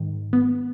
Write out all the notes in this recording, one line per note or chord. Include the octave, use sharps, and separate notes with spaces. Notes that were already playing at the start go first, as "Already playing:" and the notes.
Already playing: G#2 D#3
B3